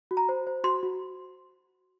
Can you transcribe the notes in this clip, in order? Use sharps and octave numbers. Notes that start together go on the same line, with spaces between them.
F#4
A#5
C5
C5
F#4 C6
F#4